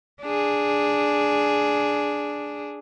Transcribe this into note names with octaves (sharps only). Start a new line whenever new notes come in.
D4 G#4